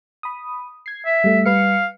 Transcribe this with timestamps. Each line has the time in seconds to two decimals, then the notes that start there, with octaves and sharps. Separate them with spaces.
0.23 B5 D#6
0.86 G#6 C7
1.05 E5
1.24 G3 A3
1.46 G3 B4 F5 C#7